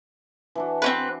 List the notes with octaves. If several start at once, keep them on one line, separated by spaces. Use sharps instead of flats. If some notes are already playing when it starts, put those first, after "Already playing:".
E3 D4 F#4
C4 C#4 B4